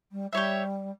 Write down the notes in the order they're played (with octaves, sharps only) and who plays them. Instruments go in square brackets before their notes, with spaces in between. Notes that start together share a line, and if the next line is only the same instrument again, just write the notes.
[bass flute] G3
[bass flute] G3 [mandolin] G4 C#5 E5